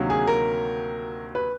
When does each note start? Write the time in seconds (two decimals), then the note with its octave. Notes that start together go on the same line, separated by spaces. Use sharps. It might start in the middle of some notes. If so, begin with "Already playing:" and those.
Already playing: D2 C3 D#3 F#3 A#3
0.10 G#4
0.27 A#4
1.35 B4